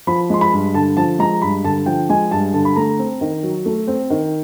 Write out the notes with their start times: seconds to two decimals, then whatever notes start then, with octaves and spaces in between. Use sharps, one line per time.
0.07 F3 B5
0.30 G#3 C6
0.41 B5
0.52 G2
0.74 D3 A5
0.97 F3 A5
1.19 G#3 A#5
1.42 G2 B5
1.64 D3 A5
1.86 F3 G5
2.09 G#3 G#5
2.31 G2 A5
2.54 D3 A5
2.65 B5
2.76 A3 A#5
2.99 C4
3.21 D#3
3.43 F#3
3.66 A3
3.88 C4
4.10 D#3